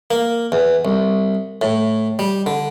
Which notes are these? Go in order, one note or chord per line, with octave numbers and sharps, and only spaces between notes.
A#3
E2
C2
A2
G3
D3